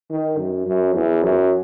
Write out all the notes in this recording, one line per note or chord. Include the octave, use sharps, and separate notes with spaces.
D#3
F#2
F#2
E2
F#2